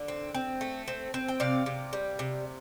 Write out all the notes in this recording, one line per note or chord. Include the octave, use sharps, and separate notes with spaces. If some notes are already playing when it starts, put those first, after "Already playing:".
Already playing: D3
C4
C4
A3
C4
C4
G5
C3 D5 F5
C3
G3
C3